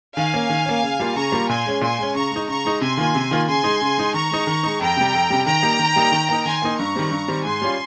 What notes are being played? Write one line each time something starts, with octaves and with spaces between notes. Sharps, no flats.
D#3 F5 G#5
A#3 C#4
D#3
A#3 C#4
C#3
G3 A#3 F4
C#3 A#5 C#6
G3 A#3 F4
A#2 G#5 C6
G#3 C#4
A#2 G#5 C6
G#3 C#4
C#3 A#5 C#6
G#3 D#4
C#3 A#5 C#6
G#3 D#4
C3 G#5 C6
D#3 A#3 F4
C3
D#3 A#3 F4
C#3 G#5 C6
G#3 D#4
C#3
G#3 D#4
D#3 A#5 C#6
G#3 D#4
D#3
G#3 D#4
F2 G5 A#5
C3 G3
F2
C3 G3
D#3 G5 A#5
G3 A#3 D#4
D#3
G3 A#3 D#4
D#3
A#3 D#4
D#3 G#5 C6
A#3 D#4
G2 A#5 C#6
D#3 G3 C4
G2
D#3 G3 C4
G#2 G#5 C6
G3 C#4 F4